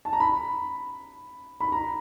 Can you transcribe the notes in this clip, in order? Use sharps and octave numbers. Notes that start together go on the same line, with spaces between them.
A5
A#5
B5
B5
A#5